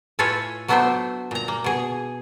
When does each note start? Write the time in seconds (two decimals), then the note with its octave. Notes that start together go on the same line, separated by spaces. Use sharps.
0.19 A2 F4 A4 B4 C#5 G#5
0.68 F#3 A3 B3 D4 E4 C5
1.31 A#2 A#5
1.48 A#3
1.64 B2 G#4